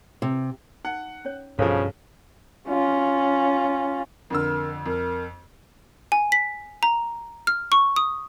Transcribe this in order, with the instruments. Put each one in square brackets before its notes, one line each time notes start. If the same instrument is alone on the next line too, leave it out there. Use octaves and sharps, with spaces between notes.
[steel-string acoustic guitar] C3
[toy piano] D#4 [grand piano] F#5
[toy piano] C#4 C#5
[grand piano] B1 F3 [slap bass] G2 [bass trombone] C#3 [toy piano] A4 C#5 F5
[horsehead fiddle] C#4 F4
[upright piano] F2 D3 E6 [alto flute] A#4
[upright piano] F2 [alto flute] A#4
[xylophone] G#5
B6
A#5
F6
C#6
D#6